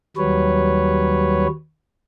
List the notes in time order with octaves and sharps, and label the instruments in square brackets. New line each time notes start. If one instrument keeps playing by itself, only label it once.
[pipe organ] D#2 F#3 G3 B4 C#5